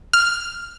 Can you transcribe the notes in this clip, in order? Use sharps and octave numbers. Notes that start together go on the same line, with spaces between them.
F6